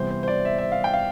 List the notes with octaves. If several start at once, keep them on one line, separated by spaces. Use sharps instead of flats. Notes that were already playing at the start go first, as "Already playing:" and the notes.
Already playing: C3 E3 G3 B3 C5
C5
C5
D5
E5
E5
F5
G5
F5